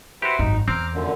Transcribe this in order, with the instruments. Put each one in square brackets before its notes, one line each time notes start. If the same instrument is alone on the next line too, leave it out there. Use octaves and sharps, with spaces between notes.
[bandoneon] E4 B4 C5 [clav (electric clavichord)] F#4 G4
[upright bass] G#1 F#2 [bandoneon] D#4
[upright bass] E2 [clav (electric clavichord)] C4 [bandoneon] A#5 D6 F6
[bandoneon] F#2 A#2 D3